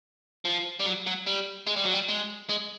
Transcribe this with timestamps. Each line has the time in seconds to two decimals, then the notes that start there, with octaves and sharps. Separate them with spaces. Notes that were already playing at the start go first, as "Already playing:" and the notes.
0.45 F3
0.79 G3
0.85 F#3
1.06 F#3
1.26 G3
1.67 G#3
1.76 G3
1.85 F#3
1.94 G3
2.09 G#3
2.49 G#3